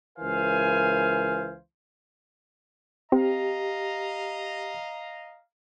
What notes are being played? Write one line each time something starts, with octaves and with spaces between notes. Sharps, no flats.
C#2 E3 A#4 C5 F5 G#5
C4 G4 D#5 F5 A#5